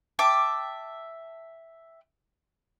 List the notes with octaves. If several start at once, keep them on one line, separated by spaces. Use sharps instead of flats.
E5 G5 A5 D6